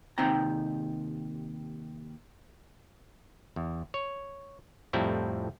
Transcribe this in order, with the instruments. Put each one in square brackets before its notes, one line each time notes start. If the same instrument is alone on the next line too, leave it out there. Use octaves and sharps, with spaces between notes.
[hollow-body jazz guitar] D#2 C3 C4 D#4 G5 A#5
[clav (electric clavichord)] E2
C#5
F2 A2 G3 C4 E4 A#5